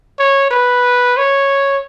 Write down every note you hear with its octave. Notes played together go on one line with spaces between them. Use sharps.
C#5
B4
C#5